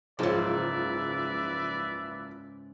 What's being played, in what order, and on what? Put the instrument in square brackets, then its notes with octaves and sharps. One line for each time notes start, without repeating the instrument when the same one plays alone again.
[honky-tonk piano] F#1 C#2 F3 [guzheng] G#2 C#3 [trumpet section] B4 D5 E5